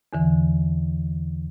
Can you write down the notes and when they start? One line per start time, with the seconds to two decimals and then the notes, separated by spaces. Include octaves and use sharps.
0.13 E2 D3 E3